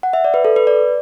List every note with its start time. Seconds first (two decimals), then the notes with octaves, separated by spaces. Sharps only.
0.03 F#5
0.13 E5
0.24 D5
0.34 B4
0.45 A4
0.56 B4
0.67 D5